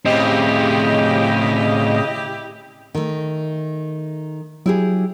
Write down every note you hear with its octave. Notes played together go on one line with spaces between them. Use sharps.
A2 C#3 C4 E4 G4 D#5
D#3 A3
F#3 E4 G4 G#4